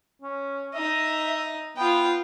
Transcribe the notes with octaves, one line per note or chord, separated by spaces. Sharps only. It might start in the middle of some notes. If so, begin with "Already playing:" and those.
C#4
D#4 D#5 E5
B3 F4 G5